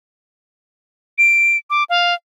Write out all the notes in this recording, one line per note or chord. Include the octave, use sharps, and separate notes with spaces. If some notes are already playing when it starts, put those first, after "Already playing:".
D7
D6
F5